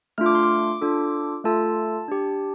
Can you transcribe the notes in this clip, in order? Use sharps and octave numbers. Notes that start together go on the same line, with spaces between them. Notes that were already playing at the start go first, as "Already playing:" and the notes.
A3 D4 F4 F6
D6
C6
D6
D4 F4 A4
A3 F4 A4 A5
D4 G4